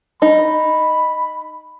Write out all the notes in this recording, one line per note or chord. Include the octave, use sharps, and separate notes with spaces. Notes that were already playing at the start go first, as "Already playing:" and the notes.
D#4 B5